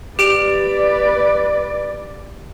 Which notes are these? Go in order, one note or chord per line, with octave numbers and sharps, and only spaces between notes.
G4 B4 D5 D7 F7